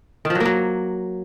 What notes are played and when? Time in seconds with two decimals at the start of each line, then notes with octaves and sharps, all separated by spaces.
0.25 D#3
0.30 F3
0.35 F#3
0.40 A#3
0.45 F#3